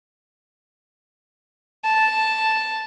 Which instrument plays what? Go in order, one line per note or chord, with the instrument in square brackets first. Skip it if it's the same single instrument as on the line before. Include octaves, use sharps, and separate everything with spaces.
[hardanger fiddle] A5